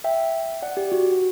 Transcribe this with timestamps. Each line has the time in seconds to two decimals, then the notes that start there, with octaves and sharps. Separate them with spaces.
0.04 E5 G5
0.62 D5 F#5
0.77 G4
0.92 F#4